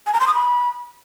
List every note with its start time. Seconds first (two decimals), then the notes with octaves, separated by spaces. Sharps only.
0.07 G#5
0.13 A#5
0.20 C6
0.27 D#6
0.34 B5